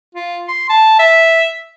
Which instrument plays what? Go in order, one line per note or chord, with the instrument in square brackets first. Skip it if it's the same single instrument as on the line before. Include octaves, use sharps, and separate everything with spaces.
[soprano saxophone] F4
C6
A5
E5